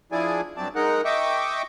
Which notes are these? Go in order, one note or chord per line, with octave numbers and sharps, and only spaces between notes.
F3 D4 E4 G#4 D5 G#5
G2 F#3 C4 D5 A5
G#3 D#4 A#4 F#5
D#5 E5 G5 C#6 D6